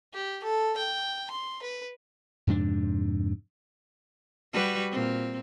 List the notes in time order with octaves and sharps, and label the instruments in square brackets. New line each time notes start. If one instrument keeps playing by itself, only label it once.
[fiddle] G4
A4
G5
C6
B4
[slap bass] F2 G#2 C3 D4
[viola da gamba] G3 F#4 B4
A#2 C4